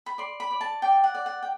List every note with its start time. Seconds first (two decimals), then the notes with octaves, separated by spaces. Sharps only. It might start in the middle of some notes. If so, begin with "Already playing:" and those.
0.06 B5
0.18 D5 C6
0.40 B5
0.51 D5
0.61 A5
0.82 D5 G5
1.04 F#5
1.15 D5
1.26 F#5
1.42 G5